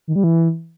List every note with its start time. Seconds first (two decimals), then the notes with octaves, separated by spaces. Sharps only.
0.08 D#3
0.16 G3
0.24 E3